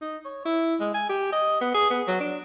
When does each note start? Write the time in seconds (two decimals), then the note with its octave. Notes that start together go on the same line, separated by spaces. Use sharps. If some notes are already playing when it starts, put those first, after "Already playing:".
0.02 D#4
0.25 C#5
0.45 E4
0.80 G#3
0.94 G#5
1.09 G4
1.32 D#5
1.61 B3
1.74 G#4
1.90 B3
2.08 F#3
2.20 D4